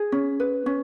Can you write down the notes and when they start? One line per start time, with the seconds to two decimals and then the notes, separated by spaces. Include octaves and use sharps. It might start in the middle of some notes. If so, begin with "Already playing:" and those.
Already playing: G#4
0.12 C#4
0.40 B4
0.66 C#4